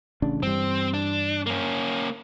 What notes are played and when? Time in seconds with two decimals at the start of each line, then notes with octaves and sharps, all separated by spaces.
0.22 A1 C#3 D4
0.43 G2 E3 G3 C4
0.94 D4
1.46 A#3 C#4